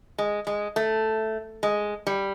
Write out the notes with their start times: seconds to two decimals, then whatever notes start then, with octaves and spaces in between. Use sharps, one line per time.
0.18 G#3
0.47 G#3
0.76 A3
1.63 G#3
2.07 G3